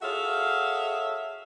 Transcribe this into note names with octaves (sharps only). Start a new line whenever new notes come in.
F#4 G#4 A4 C#5 E5 F5